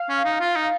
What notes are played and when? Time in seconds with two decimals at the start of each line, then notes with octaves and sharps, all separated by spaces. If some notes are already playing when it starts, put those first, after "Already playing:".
Already playing: F5
0.09 C#4
0.25 D#4
0.40 F4
0.56 D#4